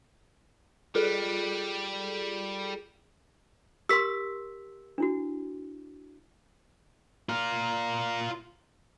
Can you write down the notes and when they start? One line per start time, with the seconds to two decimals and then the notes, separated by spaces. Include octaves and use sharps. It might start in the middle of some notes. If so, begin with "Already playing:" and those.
0.95 G3 F4 G#4 A4
3.89 G4 A#4 C6 E6 B6
4.98 D4 E4 F#4
7.29 F4 A#4